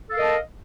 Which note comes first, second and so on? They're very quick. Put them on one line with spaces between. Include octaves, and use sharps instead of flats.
A4 F5 A#4 D#5 A5